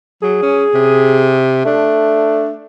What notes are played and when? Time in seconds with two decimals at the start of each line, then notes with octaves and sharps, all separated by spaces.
0.22 F#3 G#4
0.42 C#4
0.74 C3
1.65 A3 D4